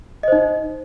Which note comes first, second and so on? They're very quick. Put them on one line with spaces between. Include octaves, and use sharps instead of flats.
D#5 C5 D#4